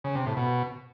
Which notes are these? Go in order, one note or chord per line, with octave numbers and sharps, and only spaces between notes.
C#3
C3
A2
B2